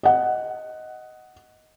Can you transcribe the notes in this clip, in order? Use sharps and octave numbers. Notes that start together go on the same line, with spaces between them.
D#5 F#5